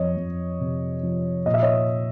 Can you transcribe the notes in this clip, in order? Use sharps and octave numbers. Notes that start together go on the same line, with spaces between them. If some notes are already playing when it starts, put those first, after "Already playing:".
Already playing: F2 C#5 D#5
F2
C3
F3
A#2 D#5
E5
C#5 D#5